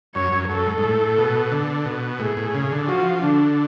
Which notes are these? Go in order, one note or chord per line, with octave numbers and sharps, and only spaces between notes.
F#2 C#5
F#2
F#2 A4
G#2
G#2
A2
B2
D3
B2
A2 G#4
A2
C#3
D3
F3 F#4
D3 D4